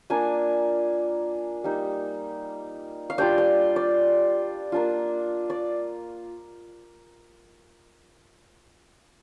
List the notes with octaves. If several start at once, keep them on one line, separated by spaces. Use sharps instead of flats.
A#3 D4 F4 G#5
G3 A#3 D#4
F5
G3 D4 F4 G5
G5
D5
A#3 D4 F4
D5